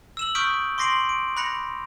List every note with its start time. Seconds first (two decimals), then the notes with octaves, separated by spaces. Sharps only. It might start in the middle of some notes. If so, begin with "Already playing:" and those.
0.17 E6 E7 F#7
0.35 C#6 D#6 F6 G6 B6 D7
0.78 C6 D6 A#6 C7 D7 F#7
1.09 D7
1.37 B5 F#6 A#6 C#7 F7